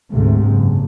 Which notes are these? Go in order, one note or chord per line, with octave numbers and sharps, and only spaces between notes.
D2 G#2 C3
F#1